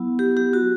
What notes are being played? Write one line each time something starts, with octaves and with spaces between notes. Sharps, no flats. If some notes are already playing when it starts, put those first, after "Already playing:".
Already playing: F#3 B3 E4
G4
G4
F#4